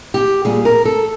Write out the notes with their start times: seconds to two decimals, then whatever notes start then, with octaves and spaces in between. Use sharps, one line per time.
0.14 G4
0.45 A#2 G3 G#4
0.65 A#4
0.85 A4